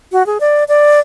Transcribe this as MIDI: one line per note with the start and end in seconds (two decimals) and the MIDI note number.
0.12 0.25 66
0.26 0.38 68
0.40 0.64 74
0.68 1.00 74